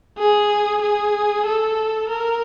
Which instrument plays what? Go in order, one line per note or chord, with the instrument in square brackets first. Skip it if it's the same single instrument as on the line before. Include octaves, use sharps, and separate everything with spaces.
[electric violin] G#4
G#4
A4
A#4